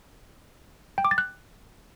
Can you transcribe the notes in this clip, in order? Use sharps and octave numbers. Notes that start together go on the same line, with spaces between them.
G5
D6
A6
F#6